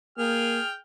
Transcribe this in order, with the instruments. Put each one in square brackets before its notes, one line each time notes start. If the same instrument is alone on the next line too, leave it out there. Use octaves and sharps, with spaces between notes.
[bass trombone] A#3 [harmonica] G#4 G5 F6